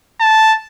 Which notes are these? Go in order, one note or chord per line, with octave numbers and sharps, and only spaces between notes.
A5